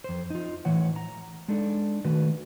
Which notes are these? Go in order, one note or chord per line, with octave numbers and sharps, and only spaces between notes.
F2 C5
D#4 F4
A2 E3 C#5 F#5
A#5
G#3 D4 D#4 A4 D5
D#3 A3 F#4 B4